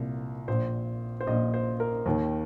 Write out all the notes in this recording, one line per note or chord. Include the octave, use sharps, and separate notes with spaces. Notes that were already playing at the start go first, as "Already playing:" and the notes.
Already playing: C2 A#2
A#1 A#2 C5
C5
A#1 A#2 D#5
C5
A#4
D#2 D#3